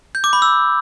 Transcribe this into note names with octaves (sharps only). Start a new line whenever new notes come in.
G6
D6
B5
E6